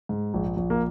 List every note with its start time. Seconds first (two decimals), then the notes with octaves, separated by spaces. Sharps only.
0.09 G#2
0.34 A#1
0.57 A#1
0.70 A#3